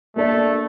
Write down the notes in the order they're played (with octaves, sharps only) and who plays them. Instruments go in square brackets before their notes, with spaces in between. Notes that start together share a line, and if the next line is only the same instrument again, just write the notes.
[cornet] A3 [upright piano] A#3 D4 A4 D5